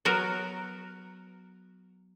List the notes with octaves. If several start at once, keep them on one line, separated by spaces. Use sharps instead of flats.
F#3 B3 F#4 A#4